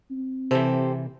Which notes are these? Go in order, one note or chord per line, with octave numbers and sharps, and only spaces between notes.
C4
C3 E3 G4 A4 C5